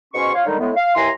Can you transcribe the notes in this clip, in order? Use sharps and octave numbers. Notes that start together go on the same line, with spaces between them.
G#2 B2 C#4 C6 C#6
F4 C#5 F5
D3 D#3 G3 G#3 D#4
A2 G#3 B3
F5
D#2 E3 G#5 A#5 C6